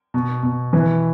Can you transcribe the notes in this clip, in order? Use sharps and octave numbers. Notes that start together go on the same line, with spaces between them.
B2
B2
E3 B4